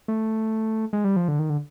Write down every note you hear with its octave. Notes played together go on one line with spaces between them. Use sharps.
A3
G#3
G3
F3
D3
D#3
D3